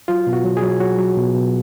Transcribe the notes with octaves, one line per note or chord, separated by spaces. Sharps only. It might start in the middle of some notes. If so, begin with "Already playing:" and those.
F#3 F4
B2
F#4
F#3
G#4
F#3
F#3 F#4
F#3
B2
B2